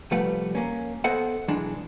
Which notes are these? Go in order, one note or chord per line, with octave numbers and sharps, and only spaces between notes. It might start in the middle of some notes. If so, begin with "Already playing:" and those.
C2 F3 G3 A3 B4 F#5
A#3 C#4
B3 A4 C5 D#5 F#5
B1 E3 G#3 D4